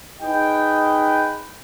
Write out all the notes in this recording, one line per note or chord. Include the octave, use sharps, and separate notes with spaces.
D#4 G#4 B4 D#5 G5